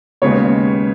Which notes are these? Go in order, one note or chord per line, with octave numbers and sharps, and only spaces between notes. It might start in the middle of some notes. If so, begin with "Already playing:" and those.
D#2 C#3 G#3 B3 C#5